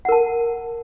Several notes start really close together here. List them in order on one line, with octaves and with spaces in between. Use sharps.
F#5 A#4 A5